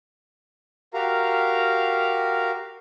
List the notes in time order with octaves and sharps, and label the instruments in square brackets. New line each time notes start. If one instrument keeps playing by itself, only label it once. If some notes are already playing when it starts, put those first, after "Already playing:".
[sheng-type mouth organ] F#4 G4 A#4 F5 A#5